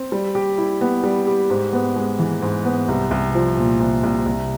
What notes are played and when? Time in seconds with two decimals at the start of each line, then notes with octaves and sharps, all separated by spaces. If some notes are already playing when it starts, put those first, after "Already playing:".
Already playing: C4
0.12 G3
0.35 G4
0.58 E4
0.81 B3
1.04 G3
1.27 G4
1.50 G#2
1.73 B3
1.96 G#3
2.19 E3
2.42 G#2
2.65 B3
2.88 C2
3.11 C2
3.34 F3
3.57 A#2
3.80 C2
4.03 C2
4.26 C2